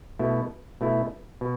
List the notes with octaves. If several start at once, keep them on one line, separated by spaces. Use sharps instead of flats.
B2 A3 E4
B2 A3 E4
B2